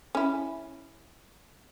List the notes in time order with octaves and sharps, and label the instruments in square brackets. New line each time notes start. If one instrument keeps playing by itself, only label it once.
[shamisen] C#4 E4